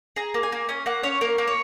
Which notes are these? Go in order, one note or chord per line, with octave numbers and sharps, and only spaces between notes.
G#4 A#5
A#3
G#5
A#3
C#4 G#5
A#3 F#5
C#4 C#5
A#3 A#4
A#3
C#5